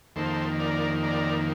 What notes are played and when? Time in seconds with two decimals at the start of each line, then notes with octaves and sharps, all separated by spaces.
0.16 F2 D#3 A#3 A4 C5
0.60 A#4 D5
1.03 A#4 D5